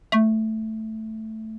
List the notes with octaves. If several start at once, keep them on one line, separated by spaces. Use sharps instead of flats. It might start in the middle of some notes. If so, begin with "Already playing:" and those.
A3